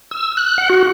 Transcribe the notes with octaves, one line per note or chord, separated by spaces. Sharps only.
E6
F#6
F#5
F#4